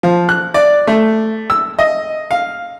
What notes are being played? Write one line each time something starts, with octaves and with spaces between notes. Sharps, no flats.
F3
F#6
D5
A3
E6
D#5
F5